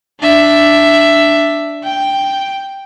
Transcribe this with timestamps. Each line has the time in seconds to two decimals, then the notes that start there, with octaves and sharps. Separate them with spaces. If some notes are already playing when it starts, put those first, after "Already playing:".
0.22 D4 E5
1.84 G5